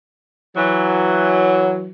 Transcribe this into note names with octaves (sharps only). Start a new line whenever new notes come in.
E3 F#3